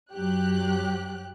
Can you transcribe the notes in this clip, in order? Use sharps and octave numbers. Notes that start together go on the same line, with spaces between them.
F#2 F#3 G4 F#6